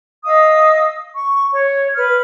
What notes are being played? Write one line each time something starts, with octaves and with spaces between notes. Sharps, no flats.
D#5 F5 D#6 E6
C#6
C#5
B4 F6